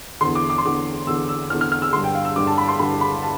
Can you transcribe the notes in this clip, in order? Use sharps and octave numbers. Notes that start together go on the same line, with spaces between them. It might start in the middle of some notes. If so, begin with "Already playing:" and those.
E2 D3 C6
D6
D6
C6
E2 D3 D6
E2 D3 E6
E6
E2 D3 F6
F6
F6
E6
G2 D3 C6
G5
F5
E6
G2 D3 D6
A5
B5
C6
G2 D3 B5
B5
A5